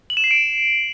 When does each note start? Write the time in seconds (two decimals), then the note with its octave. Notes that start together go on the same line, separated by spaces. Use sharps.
0.10 F#7
0.17 E7
0.24 C7
0.31 D7